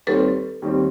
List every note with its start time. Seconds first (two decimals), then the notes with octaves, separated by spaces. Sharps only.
0.07 D#2 D#3 G3 C4 A4 B4
0.62 D#2 D#3 G3 C4